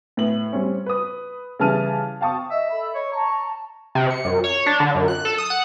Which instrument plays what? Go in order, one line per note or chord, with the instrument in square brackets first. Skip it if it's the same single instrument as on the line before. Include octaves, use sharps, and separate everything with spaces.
[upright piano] A2 B3 F#7
G3 C4 C#4
B4 D#6
C#3 E3 G3 A5 F6 D#7
F5 G5 A5 C#6 D#6
[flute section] D#5 [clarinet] E5
[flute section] A4 B5
[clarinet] C#5 [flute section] D#5
[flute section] A5 A#5 [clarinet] C#6
[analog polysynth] C3
C#7
F#2
C#5
D4
D3
F#2
F#6
A4
D#6
F#5